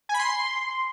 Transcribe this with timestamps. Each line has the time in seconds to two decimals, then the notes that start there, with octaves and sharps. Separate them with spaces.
0.09 G#5
0.14 B5
0.19 C6